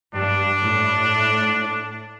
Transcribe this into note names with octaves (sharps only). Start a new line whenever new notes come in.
G2 D4
A2